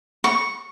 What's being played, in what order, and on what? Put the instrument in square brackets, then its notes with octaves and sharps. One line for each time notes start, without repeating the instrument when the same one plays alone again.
[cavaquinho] C#6